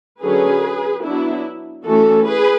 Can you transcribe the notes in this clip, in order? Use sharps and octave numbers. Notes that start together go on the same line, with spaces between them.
D3 F#3 C#4 G#4 B4
F#3 B3 D4 E4
E3 A3 C#4 F#4 A4
G#4 B4